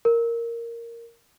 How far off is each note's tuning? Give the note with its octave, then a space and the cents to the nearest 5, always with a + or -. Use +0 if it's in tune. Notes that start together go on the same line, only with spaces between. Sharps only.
A#4 -5